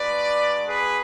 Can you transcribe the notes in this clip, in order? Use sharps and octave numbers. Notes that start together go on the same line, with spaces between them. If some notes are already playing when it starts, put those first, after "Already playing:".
Already playing: G#3 D4 F#4 B4 D5
G#4 B4